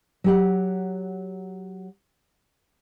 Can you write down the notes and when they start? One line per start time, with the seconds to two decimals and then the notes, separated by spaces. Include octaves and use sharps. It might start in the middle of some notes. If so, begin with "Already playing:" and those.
0.24 F#3 G4 F#5